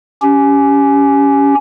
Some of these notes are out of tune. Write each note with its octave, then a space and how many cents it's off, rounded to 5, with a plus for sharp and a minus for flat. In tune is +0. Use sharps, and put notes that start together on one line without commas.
C#4 +15 G4 +0